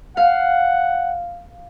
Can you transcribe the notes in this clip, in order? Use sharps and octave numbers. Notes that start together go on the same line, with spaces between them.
F5 F#5